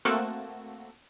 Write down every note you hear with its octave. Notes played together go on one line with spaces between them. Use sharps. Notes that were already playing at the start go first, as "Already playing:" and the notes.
A3 A#3 C4 F#4 A4